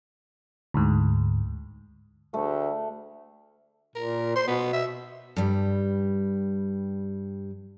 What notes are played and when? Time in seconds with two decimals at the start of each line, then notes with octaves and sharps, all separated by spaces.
0.74 D2 G#2
2.34 D2 A3
3.96 A#2 A#4
4.36 C5 C6
4.48 B2 B3
4.73 E5
5.36 G2 G3